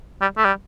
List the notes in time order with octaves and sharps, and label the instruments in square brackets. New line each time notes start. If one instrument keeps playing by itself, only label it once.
[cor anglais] G3
A3
G3